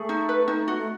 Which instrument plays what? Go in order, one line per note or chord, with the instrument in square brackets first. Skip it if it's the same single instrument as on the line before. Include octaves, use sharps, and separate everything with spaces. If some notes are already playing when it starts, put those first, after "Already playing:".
Already playing: [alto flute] A3 [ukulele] G#4
[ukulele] D#4
B4
D#4
F#4
[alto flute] A3